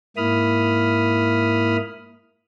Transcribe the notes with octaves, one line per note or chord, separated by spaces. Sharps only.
G#2 A#3 E4 B5 D#6 F6